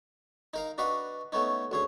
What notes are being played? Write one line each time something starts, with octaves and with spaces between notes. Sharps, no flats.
D#4 A#4 F5
D4 F#4 B4 D#5 F5
A3 B3 C#4 D#4
D2 C#4 G#4